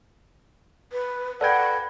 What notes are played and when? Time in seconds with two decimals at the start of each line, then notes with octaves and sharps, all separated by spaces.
0.93 B4
1.41 A4 B4 D5 F#5 G5 B5 G#6